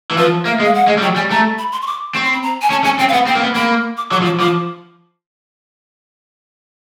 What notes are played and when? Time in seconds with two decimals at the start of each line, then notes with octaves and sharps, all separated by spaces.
0.11 E3
0.17 F3 B4
0.45 A#3 E5
0.60 G#3
0.65 F5
0.74 F#5
0.87 G#3
0.97 G3
1.02 F#3 G5
1.16 G3 G#5
1.30 A3 A#5
1.58 B5
1.72 C6
1.82 C#6
1.87 D6
2.14 C4 C#6
2.24 C6
2.33 B5
2.43 A#5
2.62 G#5
2.70 C#4 A5
2.84 C#4 G#5
2.99 C4 G5
3.09 F5
3.13 B3 F#5
3.26 C4 G5
3.35 A#3
3.41 B3
3.55 A#3 B5
3.97 D6
4.11 F#3 D6
4.21 F3
4.25 D6
4.39 F3 D6